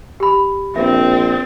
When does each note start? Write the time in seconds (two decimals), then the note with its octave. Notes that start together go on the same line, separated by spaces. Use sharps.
0.20 G4 B5
0.76 A#1 C4 E5